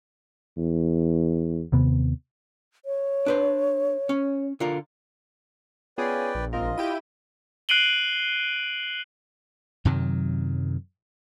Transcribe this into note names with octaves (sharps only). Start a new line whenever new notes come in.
E2
D#2 C3 B3
C#5
D4 B4 C5
C#4
D3 F4 A#4
B3 C#4 F4 G#4 B4 D5 G5
A#1
G#1 C4 F4 A#4 D#5
E4 G4 G5 D#7
F#6 C7 D7 D#7 F#7 G7
F#2 C3 D#3 F#3